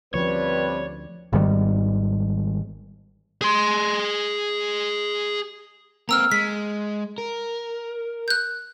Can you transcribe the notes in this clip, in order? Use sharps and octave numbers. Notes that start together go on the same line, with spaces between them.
D2 G2 F3 C4 C#4 B4 C#5 D5
G#1 G#2 D#3 G3
G#4 C6
A#3 C4 A#5 E6 F6
G#3 B6
A#4
F#6 G6